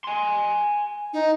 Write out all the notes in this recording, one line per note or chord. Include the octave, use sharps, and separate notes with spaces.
G#5 C6
D#4